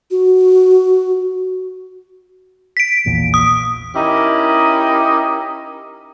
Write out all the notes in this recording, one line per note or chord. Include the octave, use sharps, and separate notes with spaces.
F#4
B6 D7
A#1 E2 A#2
D#6
C#4 D#4 E4 G4 A#4 D#5